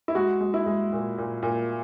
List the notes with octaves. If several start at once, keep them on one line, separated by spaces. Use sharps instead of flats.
E4
G#3 F#4
G#3
E4
G#3
A#2
A#2
A#2